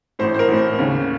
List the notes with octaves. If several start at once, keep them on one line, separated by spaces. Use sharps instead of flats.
A1 A2 C5
C5
A#4
A1 A2
D#2 C#3